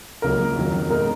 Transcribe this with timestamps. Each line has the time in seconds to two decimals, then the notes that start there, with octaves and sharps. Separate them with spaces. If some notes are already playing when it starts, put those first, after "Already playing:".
0.22 C#2 C#3 F#3 A#3 C#4 A#4
0.56 F2 D#3 F#3
0.90 B2 G#3 D#4 A#4